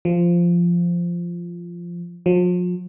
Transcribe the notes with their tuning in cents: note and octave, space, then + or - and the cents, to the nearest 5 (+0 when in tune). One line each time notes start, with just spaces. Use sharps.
F3 -10
F3 +40